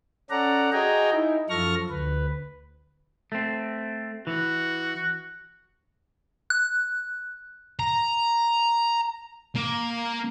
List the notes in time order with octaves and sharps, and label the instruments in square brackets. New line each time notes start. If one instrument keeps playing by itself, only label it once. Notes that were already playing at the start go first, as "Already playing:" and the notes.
[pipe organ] C#4 A4 D5 F#5 A#5
F#4 G#4 D#5 G5 G#5 A#5
D#4 E4
F#2 F3 A4 C#6 F6 A#6
D2 B4
[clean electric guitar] A3 C4
[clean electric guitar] E3 [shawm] F#4
[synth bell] F#6
[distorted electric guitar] A#5
A#3